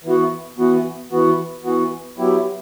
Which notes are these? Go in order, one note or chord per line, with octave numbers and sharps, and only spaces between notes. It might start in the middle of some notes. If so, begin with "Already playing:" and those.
E3 B3 F#4
E3 B3 F#4
E3 B3 F#4
E3 B3 F#4
F#3 B3 E4 G4